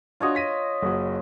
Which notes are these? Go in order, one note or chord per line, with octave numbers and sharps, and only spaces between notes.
D4 F4 F#4 C#5 D#5
A#6 B6 D#7
F#1 F#4